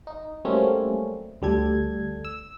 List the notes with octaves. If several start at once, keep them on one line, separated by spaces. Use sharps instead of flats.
D#4
F#3 G3 A3 A#3 C4 C#4
D2 G3 A4 G#6
E6